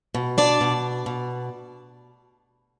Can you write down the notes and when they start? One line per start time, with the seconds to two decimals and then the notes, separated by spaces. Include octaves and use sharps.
0.15 B2
0.38 D4 D5
0.61 B2
1.06 B2